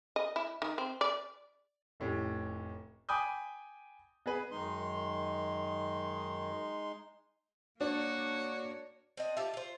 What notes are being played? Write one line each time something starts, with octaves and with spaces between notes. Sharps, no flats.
D#5
E4
D#3
C4
D5
F1 A2 C#4 G4
G5 G#5 B5 D6 D#6 G6
B3 G#4 B4
F#2 D#3 G#3 D#4 C6
A#3 D4 F#4 C#5
C4 D4 D#5
F4 G4 A4 E5
F4 C5